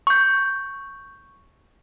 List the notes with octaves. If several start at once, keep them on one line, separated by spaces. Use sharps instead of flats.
C#6 G6